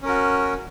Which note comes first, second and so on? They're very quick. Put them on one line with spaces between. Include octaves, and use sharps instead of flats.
C#4 A#4 F#4